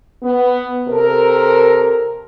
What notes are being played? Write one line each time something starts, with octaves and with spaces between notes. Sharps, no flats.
B3
C3 A4 A#4